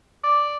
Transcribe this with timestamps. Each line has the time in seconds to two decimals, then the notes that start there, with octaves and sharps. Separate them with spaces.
0.24 D5